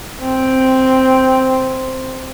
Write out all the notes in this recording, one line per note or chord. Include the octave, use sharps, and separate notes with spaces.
C4